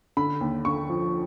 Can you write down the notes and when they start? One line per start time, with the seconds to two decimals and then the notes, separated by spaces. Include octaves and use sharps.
0.17 D3 B5
0.41 D#2
0.65 D3 C#6
0.90 F3